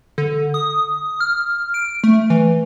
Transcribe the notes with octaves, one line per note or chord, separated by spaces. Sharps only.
D3
D#6
F6
D7
A3
E3